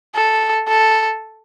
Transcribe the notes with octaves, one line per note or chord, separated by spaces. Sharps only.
A4
A4